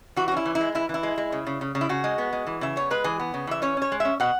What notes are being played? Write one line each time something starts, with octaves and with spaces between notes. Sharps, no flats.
E3 F#4
F#4
C#4
E4
E3
E4
G#3
E3 E4
E3
E4
G#3
G#3
C#3
C#3
C#3
C#3
E4
C#3 F#4
G#3
B3
G#3
E3
C#3 E5
B3 C#5
G#3 B4
E3 G#4
B3
C#3
E3 E5
C#4 C#5
C#4 C#5
G#3
C#4 E5
B2 F#5